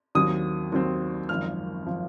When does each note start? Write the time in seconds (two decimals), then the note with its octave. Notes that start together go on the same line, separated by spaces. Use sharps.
0.15 D#2 D#3 F#3 C4 D#6
0.72 D#2 D#3 F#3 C4
1.29 G#1 F#2 F3 F6
1.86 F3